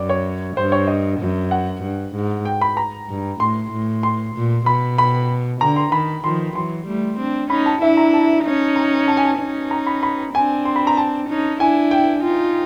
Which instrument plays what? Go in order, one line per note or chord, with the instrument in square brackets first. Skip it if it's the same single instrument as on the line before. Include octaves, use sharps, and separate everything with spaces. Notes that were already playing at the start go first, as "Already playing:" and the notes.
Already playing: [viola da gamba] F#2 [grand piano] D5
[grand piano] C#5
[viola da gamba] G2 [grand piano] C5
[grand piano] C#5
D#5
[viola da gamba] F#2
[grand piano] F#5
[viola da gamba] G2
G#2
[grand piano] G5
B5
A#5
[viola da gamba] G2
[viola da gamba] A2 [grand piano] C6
[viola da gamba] A2
[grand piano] C6
[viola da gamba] A#2
[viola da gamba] B2 [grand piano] B5
[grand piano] B5
[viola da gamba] D3 [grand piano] A#5
[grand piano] C6
[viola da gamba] D#3 [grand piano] B5
[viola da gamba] D#3 F3 [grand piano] C6
[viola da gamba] E3 F#3 [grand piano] C6
[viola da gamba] G3 A3
C4 D4
[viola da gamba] C#4 D#4 [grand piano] B5
[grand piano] A5
[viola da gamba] D4 E4 [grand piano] E5
[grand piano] A#5
A5
[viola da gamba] C#4 D#4
[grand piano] A#5
A5
G#5
A5
[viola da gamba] C#4 D#4
[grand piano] A#5
B5
B5
[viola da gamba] C4 D4 [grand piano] G#5
[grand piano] C6
B5
A#5
A5
[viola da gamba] C#4 D#4
[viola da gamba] D4 E4 [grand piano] G#5
[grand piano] G5
[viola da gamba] D#4 F4